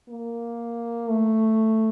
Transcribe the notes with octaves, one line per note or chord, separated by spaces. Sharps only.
A#3
A3